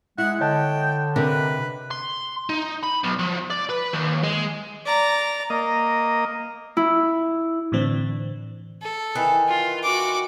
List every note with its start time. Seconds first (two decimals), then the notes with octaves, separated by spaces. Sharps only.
0.18 G#3 E4 F#5
0.41 D3 C#5 D#5 G5 A5
1.16 C3 D4 A#4 B4
1.91 C6
2.49 D#4
2.83 B5
3.04 B1
3.19 F3
3.50 D5
3.69 B4
3.93 D#2
4.23 G#3
4.86 D5 A#5
5.50 A#3 D#5
6.77 E4
7.72 A2 D3 E3 C4 D4
8.82 A4
9.15 D#3 E3 B4
9.49 F4
9.84 F#4 D6